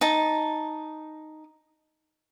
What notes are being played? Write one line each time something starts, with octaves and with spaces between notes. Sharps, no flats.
D#4 A5